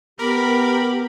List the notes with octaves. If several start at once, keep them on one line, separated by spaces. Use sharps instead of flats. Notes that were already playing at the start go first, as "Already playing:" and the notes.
B3 G4 A#4 B5 D6